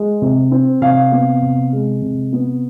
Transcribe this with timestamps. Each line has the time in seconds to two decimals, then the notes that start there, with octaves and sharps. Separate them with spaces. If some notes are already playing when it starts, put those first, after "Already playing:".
Already playing: G#3
0.22 C3
0.51 C4
0.82 C3 F5
1.12 B3
1.42 C3
1.73 G#3
2.02 C3
2.33 B3